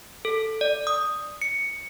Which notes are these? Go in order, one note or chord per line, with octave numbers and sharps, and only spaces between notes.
A4
D5
D#6
C#7